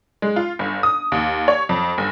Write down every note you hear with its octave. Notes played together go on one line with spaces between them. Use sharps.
G#3
F4
G1
D#6
D#2
C#5
F2
G1